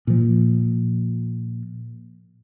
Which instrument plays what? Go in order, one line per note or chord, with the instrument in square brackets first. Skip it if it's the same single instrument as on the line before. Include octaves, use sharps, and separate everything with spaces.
[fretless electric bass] A#2 F3